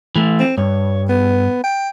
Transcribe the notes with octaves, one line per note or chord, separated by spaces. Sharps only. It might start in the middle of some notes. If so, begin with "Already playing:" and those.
E3 A3
C4
G2 C#5
B3
G5